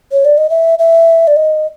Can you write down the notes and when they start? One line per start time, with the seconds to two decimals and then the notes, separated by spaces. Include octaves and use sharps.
0.12 C#5
0.25 D5
0.38 D#5
0.50 E5
0.79 E5
1.27 D5
1.36 D#5